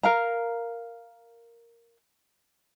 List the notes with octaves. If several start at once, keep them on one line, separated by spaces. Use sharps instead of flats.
A#4 F5 A#5